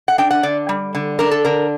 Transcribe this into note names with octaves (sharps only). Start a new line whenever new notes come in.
F#5
D4 G5
F#5
D3 D5
G3
D3
D4 A#4
A4
D3 A#4